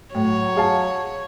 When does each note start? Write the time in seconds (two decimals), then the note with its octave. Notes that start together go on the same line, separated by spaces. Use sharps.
0.15 A2 F#3 C#5
0.56 G#4 F5 A5